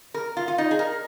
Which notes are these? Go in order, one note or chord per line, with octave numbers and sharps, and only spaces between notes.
A#4
F4
F4
D#4
G#4
A#4